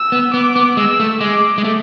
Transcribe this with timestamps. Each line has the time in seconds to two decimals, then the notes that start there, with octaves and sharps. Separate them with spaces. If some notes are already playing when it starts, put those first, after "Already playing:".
Already playing: E6
0.12 B3
0.34 B3 D6
0.56 B3
0.77 G#3 E6
1.00 A3
1.21 G#3 D6
1.58 G#3
1.64 A3